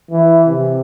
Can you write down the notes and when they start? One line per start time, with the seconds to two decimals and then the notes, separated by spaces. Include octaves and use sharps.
0.11 E3
0.47 C3